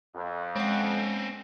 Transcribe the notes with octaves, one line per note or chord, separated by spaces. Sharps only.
F2
G#3 C4 C#4 F#5